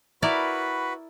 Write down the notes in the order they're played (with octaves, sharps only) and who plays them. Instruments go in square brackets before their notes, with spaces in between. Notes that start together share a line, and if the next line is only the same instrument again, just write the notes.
[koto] E4 A#4 D5 [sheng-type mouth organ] F#4 B4 B5